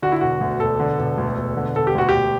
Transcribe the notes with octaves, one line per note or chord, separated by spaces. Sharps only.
D3 F#4
E4
E1 F#4
D2
E1 A4
D3
E1
D2
E1
D3
E1 A4
G4
D2 F#4
G4
E1